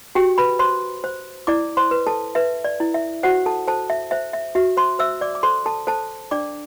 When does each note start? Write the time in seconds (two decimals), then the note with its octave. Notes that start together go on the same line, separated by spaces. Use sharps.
0.15 F#4 G4 G5
0.38 B4 B5
0.59 C5 C6
1.04 C5
1.47 E4 D5 D6
1.77 C5 C6
1.91 B4
2.07 A4 A5
2.35 B4 E5
2.64 D5
2.80 E4
2.94 E5
3.23 F#4 C5 F#5
3.46 A4 A5
3.68 A4 C5 A5
3.90 E5
4.11 C5 E5
4.33 E5
4.55 F#4 E5
4.77 C5 C6
4.99 C5 E5 E6
5.21 D5 D6
5.35 D6
5.43 A4 C5 C6
5.66 A4 A5
5.87 A4 C5 A5
6.31 D4 D5 D6